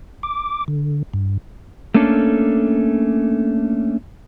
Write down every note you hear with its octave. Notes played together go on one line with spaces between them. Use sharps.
D6
D3
G2
A3 A#3 C#4 D4 A4